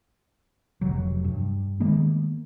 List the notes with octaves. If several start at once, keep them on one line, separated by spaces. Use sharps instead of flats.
F1 C3 F#3
G2
D#3 G#3 A#3 B3